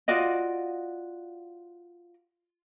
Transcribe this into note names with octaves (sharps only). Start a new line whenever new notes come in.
F4 F#4 D5 D#5